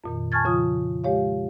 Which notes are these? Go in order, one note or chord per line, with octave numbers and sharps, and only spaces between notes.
F2 A#2 D#3
G#5 A5 C#6 F6 G#6 A6
C#3 F3 F4 D#6
G#3 G4 C#5 F5